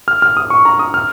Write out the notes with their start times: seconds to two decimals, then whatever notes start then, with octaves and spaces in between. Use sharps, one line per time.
0.08 F6
0.22 F6
0.37 D#6
0.50 C#6
0.65 A#5
0.79 D#6
0.94 F6